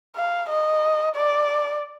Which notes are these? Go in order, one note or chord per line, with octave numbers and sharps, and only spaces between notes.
F5
D#5
D5